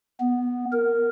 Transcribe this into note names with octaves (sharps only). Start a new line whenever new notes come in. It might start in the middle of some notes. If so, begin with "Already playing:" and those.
B3
A#4